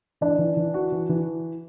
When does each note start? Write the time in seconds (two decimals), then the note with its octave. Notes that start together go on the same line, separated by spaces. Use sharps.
0.21 E3 D4
0.38 E3
0.57 E3
0.74 F#4
0.92 E3
1.09 E3